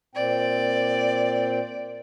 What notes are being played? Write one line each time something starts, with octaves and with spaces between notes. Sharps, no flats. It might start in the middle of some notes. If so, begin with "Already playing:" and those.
A#2 C4 D5 G5